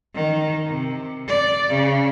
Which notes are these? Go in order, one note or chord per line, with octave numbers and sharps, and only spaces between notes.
D#3
C3
D5
C#3